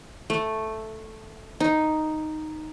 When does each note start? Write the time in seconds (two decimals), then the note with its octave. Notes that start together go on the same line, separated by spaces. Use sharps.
0.30 A3
1.60 D#4